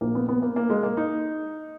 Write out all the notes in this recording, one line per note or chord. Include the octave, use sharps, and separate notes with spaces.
A#1 A#2 A#3
B3
B3
A#3
A#3
G#3
A#3
D#4